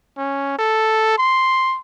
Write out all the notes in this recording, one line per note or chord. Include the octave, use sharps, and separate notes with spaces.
C#4
A4
C6